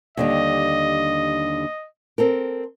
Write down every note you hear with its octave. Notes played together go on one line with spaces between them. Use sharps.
D#2 D3 G3 D#5
C4 A4 A#4